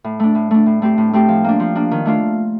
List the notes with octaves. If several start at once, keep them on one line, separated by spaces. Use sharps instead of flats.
A2
A3 D4
A2
A3 D4
A2
A3 C4 G4
A2
A3 C4 G4
F3
A#3 D4
F3
A#3 D4
D#3
A3 D4 F4